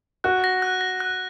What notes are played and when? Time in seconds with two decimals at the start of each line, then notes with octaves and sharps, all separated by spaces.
0.24 F#4 F#6
0.44 A#6
0.62 F#6
0.81 A#6
1.00 F#6